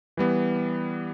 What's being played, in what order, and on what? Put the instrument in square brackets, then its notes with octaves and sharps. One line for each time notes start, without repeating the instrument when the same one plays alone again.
[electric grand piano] E3 G3 B3